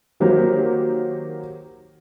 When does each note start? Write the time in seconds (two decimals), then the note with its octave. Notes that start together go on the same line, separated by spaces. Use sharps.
0.20 D#3 F#3 A#3 G4 A#4 C5